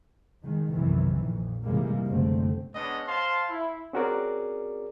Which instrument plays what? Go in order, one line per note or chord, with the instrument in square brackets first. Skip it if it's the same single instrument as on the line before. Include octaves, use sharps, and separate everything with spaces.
[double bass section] D#3 G#3
B1 F#2 C3 D#3 E3
A#1 F2 A#2
G#2 C3 E3 G3 G#3 A#3
F1 C2 F#2 D3 A3 C4
[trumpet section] G#3 B3 C#4 D4 D#5
C5 F5 A5 C6
E4
[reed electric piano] C4 C#4 F#4 G#4 A#4 D5